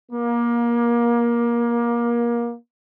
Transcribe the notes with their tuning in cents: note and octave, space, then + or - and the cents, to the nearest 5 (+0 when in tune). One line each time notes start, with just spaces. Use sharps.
A#3 +25